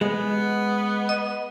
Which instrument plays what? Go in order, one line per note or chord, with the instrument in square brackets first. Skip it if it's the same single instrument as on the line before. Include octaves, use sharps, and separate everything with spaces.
[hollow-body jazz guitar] G#3 [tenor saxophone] B3
[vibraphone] D#5